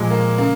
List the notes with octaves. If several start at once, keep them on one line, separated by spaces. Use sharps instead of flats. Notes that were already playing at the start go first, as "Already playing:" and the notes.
Already playing: A#2 F3 G#3
A#3
C#3 A#3